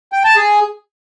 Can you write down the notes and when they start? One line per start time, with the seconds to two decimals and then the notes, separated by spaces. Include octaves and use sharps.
0.12 G5
0.24 A5
0.36 G#4